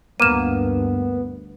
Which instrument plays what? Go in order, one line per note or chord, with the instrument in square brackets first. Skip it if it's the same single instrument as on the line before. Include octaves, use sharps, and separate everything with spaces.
[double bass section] D2 G2 [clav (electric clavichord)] A#3 [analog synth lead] B3 [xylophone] D#7 E7